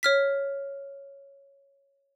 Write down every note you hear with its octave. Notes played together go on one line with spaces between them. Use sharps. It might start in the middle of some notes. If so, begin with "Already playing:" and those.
C#5 F6 B6